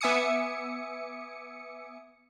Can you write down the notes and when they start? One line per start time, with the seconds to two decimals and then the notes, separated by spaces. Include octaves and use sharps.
0.01 B3 E5 G#5 D6 D#6 C#7